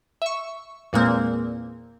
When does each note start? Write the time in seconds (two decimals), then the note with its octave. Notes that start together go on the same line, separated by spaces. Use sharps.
0.22 E5 C#6
0.93 E2 A#2 G#3 A#3 C4